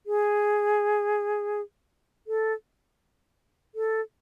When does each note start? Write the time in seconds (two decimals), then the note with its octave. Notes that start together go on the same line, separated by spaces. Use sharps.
0.06 G#4
2.27 A4
3.75 A4